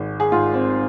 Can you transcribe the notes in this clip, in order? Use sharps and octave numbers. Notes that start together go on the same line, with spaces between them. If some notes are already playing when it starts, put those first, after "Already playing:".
Already playing: G#1 G#3
G#4
G#2 F4
C4